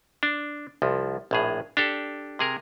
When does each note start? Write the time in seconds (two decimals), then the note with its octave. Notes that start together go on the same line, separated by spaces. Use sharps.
0.23 D4
0.82 C2 F3
1.31 A#1 A2 G#4
1.77 D4 G4 A4
2.39 C3 G#4 A#4